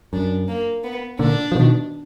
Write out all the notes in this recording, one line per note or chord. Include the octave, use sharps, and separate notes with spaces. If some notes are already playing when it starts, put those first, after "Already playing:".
F#2 D4
A#3
B3
A#2 D3 D4
F3
B2 D#3